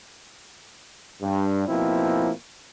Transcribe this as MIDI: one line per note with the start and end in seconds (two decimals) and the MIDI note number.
1.22 1.66 43
1.68 2.31 47
1.68 2.31 53
1.68 2.31 58
1.68 2.31 60
1.68 2.31 64